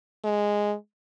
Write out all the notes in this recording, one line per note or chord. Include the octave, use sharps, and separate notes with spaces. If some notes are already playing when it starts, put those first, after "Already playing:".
G#3